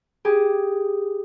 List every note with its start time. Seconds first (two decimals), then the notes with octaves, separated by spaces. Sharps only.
0.25 G4 G#4